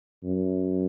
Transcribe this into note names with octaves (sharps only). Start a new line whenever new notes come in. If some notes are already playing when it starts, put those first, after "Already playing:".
F#2